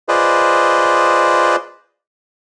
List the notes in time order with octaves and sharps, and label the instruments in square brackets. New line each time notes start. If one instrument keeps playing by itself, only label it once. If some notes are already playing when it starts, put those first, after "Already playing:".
[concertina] F4 G#4 B4 C5 D5 D#5